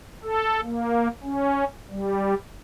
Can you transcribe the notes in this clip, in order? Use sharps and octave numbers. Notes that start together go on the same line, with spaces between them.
A4
A#3
C#4
G3